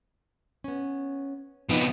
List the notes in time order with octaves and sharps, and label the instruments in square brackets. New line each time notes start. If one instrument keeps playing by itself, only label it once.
[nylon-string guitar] B3 C#4
[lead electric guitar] C3 B3 [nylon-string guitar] F3 D#4